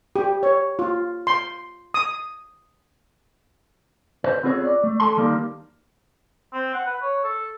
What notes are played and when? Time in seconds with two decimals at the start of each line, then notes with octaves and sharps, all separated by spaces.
0.16 G4
0.43 C#5
0.79 F4
1.27 C6
1.94 D#6
4.24 B4 C5
4.43 B3 C4 F4 G#4 C5 C#5
4.65 D5
4.84 A3
5.00 A4 A5 C6
5.17 D#3 G3 A#3 D#4
6.53 C4
6.74 F#5
6.87 B4
7.02 C#5
7.24 A4